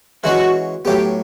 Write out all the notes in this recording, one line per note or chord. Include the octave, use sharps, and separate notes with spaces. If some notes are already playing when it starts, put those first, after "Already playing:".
E3 G#3 C#4 F#4
A2 F#3 B3 G4